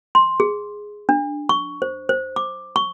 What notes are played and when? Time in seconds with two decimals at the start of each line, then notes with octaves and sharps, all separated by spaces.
0.15 C6
0.40 G#4
1.09 D4
1.49 C#6
1.82 C5
2.09 C5
2.36 D6
2.76 C#6